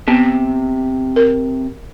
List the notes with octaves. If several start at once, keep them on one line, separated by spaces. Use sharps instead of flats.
C3 B3
A#4